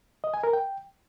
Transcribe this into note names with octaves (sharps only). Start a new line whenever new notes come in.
D#5
G#5
A#4
G5